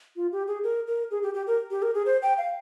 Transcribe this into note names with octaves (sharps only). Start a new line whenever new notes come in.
F4
G4
G#4
A#4
A#4
G#4
G4
G4
A#4
G4
A#4
G#4
C5
G5
F5